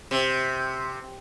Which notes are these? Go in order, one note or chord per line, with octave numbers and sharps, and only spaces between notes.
C3